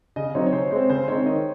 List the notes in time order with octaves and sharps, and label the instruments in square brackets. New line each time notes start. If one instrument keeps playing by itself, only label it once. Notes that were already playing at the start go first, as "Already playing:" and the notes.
[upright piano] C#3 [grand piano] D#5
[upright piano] F#3 C4 D#4 [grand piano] C#5
[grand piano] C#5
[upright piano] C#3 [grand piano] C5
[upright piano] G#3 C4 [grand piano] C5
[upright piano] C#3 [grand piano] C5
[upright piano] G#3 C4 D#4 [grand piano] C#5
[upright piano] D#3 [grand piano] D#5